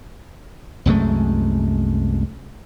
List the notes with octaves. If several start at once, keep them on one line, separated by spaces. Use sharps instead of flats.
C2 F#2 G#3 A3